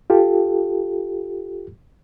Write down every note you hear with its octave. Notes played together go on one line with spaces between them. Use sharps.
F4 G4 A4